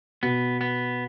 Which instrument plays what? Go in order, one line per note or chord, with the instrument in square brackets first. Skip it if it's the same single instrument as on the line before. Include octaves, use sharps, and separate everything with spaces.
[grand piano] B2 [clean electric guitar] B3
[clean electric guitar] B3